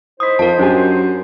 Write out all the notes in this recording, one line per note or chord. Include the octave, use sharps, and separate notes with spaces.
D#4 E4 C5 D#6 B6
F2 A#4 A5
F#2 D4 G4 G#5